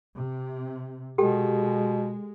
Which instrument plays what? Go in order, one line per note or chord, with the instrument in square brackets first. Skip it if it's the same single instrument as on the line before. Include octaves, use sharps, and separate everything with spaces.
[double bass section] C3
[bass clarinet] B2 [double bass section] G#3 [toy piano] G4 A4 G5